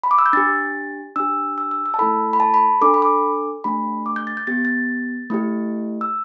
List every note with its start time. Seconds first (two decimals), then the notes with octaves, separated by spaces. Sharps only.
0.04 B5
0.11 D6
0.18 E6
0.26 G6
0.33 D4 G4 A6
1.16 D4 G4 E6
1.58 E6
1.71 E6
1.86 E6
1.94 A5
1.99 A3 E4 A4 B5
2.33 B5
2.40 A5
2.54 B5
2.81 D4 A4 D6
2.94 B5
3.02 D6
3.64 A3 D4 G4 B5
4.06 D6
4.16 G6
4.27 A6
4.37 G6
4.47 B3 G4 A6
4.65 A6
5.30 A3 E4 G4
6.01 E6